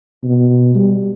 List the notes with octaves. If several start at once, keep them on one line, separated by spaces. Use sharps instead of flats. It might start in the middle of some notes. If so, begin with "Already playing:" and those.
B2
G3